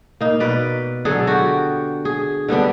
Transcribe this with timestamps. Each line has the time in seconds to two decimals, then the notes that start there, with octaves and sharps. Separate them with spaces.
0.21 A#3 D#4
0.40 B2 B4 D5
1.05 D3 F#3 G#4 A4
1.27 F#4 G4
2.05 G#4
2.48 D3 G3 B3 D4